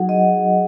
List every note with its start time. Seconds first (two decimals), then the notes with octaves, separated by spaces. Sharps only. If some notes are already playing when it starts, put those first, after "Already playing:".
Already playing: F#3 D#4 F#4 G#4 F#5
0.09 D#5